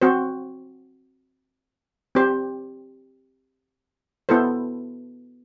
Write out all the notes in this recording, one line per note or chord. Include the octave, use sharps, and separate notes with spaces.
C4 F#4 C5
C4 G4 C5
B3 E4 A4 C5